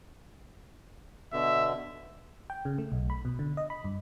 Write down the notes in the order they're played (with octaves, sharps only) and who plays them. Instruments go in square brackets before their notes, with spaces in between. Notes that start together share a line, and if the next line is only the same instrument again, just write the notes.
[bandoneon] B2 D3 [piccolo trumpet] E5
[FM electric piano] G5
C#3
A3
B1
B5
B2
D3
D#5
B5
G2